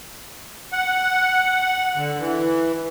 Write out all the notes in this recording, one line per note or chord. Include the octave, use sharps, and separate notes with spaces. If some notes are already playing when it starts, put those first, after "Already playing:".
F#5
D3
E3